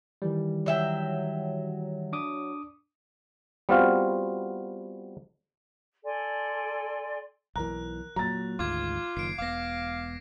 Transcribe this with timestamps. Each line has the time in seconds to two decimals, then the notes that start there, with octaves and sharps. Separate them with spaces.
0.22 D#3 E3 G3
0.66 F#3 E5 G5
2.13 D4 D6 D#6
3.69 G3 B3 C4 F4 F#4 F5
6.04 A4 D5 G#5 C6
7.56 B1 E3 A#4 A#5 F#6
8.16 A#2 F#3 A#5 A6
8.59 G#1 D2 G#2 F4 D6 G#6
9.17 F#1 D#3 C7 D7
9.38 E1 B3 F5 D6 A#6